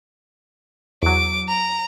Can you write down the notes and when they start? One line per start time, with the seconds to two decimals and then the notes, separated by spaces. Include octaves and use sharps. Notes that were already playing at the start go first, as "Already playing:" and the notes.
1.03 E2 F#3 D6
1.48 A#5